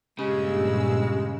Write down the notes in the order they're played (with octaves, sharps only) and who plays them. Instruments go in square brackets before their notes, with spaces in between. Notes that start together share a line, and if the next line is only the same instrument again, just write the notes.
[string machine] G2 A#2 E6 [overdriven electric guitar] C#3 [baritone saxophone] G#3 [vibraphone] G4